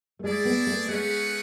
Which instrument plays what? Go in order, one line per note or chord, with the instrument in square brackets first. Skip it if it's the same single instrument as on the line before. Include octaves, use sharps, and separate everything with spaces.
[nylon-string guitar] A3
[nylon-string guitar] G#3 [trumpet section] E4 G#4 D5
[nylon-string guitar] B3
A3
[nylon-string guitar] G#3 [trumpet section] A3 C#4 G#4 B4 F#5